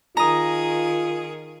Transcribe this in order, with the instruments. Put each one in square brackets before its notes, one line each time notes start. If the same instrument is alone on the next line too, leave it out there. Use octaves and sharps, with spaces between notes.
[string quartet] D#3 G#4 [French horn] F4 [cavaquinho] A#5 D#6